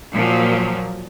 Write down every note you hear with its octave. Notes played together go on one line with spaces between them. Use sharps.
A#2 F3 F#3